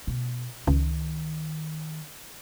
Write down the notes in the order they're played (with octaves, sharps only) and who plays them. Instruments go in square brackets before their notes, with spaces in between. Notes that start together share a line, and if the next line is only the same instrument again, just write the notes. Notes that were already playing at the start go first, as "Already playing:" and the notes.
[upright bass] B2
[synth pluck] C#2 [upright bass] D#3